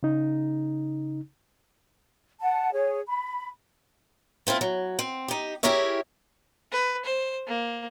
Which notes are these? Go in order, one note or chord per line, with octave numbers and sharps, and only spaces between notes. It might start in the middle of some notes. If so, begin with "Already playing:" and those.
C#3 D#4
F#5 A5
G#4 C#5
B5
A3 C4 E4 F4
F#3
C4
D#4 G4
E4 G4 G#4 A#4 C#5 E5
B4
C5
A#3